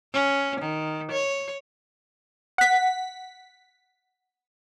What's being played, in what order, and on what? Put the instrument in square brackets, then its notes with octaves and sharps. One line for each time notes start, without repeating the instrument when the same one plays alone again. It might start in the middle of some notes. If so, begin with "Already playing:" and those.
[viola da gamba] C#4
D#3
C#5
[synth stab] F#5 B6